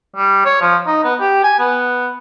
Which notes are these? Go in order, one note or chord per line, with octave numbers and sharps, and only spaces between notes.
G3
C#5
F3
D#4
B3
G4
G#5
B3